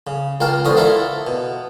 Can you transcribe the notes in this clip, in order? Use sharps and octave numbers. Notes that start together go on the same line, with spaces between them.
C#3
C#2 A#4 F5 G5 A5
E2 D3 F#4 C5 D#6
E4 F4 A4 A#4 E5 F5
B2